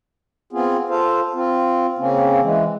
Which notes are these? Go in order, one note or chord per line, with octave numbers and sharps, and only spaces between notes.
B3 C4 F4 G#4
F4 A4 C5 F5
C4 F4
C#3 A#3 C4 C#4
E3 G#3